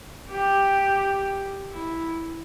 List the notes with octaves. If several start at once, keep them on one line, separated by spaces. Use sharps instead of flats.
G4
E4